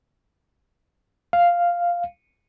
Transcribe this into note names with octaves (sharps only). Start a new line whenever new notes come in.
F5